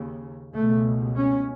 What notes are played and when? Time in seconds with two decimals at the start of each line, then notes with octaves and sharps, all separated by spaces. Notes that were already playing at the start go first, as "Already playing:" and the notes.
Already playing: D#2 C#3
0.54 C#2 B2 A3
1.17 C#4